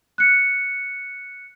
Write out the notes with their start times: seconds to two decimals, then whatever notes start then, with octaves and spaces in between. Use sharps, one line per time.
0.18 F#6 C#7